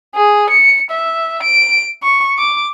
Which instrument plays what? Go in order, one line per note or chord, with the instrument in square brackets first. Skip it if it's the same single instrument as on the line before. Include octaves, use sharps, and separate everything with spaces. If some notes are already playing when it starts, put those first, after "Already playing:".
[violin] G#4
C#7
E5
D7
C#6
D6